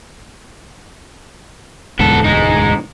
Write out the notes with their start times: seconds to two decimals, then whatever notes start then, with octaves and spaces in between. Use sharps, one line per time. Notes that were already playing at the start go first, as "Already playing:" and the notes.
1.99 E1 D2 G#2 B3 A4
2.24 G#3 D#4